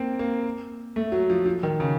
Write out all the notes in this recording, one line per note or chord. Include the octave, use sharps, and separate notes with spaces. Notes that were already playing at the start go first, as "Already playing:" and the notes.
Already playing: A#3 C4
A#3
A3
F#3
F3
F3
D#3
C#3